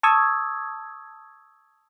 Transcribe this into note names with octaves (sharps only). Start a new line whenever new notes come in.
A5 C#6 D#6 E6 G#6